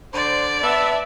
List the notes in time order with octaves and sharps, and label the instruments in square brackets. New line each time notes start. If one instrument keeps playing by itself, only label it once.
[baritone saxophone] D3 [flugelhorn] C5 [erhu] D5
[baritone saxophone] B3 [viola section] E5 [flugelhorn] A5